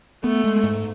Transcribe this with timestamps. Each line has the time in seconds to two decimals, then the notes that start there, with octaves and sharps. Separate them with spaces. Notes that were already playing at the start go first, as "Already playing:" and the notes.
0.24 A3 B3
0.44 G#3
0.63 G#2